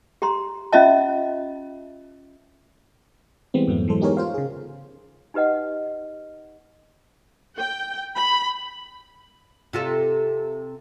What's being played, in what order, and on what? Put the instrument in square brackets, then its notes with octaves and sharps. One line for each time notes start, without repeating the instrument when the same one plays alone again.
[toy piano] G4 A#5 C6
C#4 F4 D#5 E5 A5
[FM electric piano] E3 G3 G#3 B3 C4
F2 G#2 F#3 A3 B3
E3 F#3 G#3 A4 C5
B3 D#4 G4 G#4 A#4 C#5
F4 C5 F5
C#3 G#4
[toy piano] D#4 G4 B4 D#5 F#5
[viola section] G5
B5
[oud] C3 F4 A4